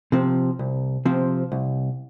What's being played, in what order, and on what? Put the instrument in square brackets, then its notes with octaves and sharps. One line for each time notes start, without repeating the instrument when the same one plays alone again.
[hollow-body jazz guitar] C3 F3 C4
C2
C3 F3 C4
C2